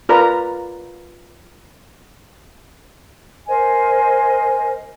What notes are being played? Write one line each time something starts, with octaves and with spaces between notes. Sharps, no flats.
F4 A#4 B4 D5 A#5
A#4 C5 D#5 G#5